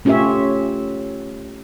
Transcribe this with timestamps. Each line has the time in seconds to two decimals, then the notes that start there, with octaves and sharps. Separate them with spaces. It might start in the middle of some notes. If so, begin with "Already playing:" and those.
0.05 A3 C#4 F4 G4 C#5 E5